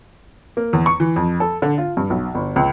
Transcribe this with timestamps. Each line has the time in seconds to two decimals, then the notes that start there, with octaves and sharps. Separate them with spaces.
0.57 A#3
0.73 E2
0.86 C#6
1.00 E3
1.16 F2
1.40 A4
1.62 D3
1.78 F4
1.97 G2
2.10 B1
2.35 G1
2.56 C#2